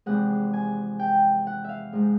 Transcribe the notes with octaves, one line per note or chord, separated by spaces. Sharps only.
E2 C3 F3 G#3 F#5
G#5
G5
F#5
E5 F5
G#2 F3 G#3